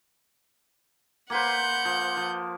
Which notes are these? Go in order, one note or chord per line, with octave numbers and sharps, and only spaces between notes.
A#3 B4 C5 F#5 G6
F3
F3